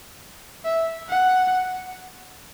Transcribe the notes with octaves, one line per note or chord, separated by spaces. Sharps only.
E5
F#5